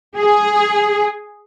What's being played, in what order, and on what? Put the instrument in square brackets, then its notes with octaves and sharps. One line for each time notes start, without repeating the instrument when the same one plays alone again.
[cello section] G#4